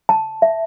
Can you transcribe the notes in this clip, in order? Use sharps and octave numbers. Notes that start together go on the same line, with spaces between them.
A5
E5